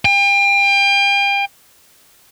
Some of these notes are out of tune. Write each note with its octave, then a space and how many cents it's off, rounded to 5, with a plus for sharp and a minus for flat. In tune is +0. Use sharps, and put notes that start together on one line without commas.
G5 +35